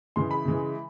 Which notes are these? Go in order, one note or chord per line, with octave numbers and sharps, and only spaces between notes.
C#3 E3 G#3 C6
B5
C#3 E3 G#3